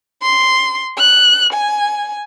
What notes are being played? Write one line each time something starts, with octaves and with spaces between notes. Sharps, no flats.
C6
F#6
G#5